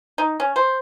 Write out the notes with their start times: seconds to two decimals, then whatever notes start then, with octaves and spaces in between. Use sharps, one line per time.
0.18 D#4
0.40 C#4
0.56 C5